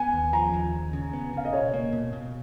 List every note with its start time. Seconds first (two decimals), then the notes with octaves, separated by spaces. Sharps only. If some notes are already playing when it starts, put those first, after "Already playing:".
Already playing: B3 G#5
0.13 D#2
0.33 F3 A#5
0.54 D#2
0.73 D#2
0.93 C#3
1.13 B3
1.33 C#3 F5
1.45 D#5
1.53 B2 C#5
1.74 A#3
1.93 B2
2.13 B2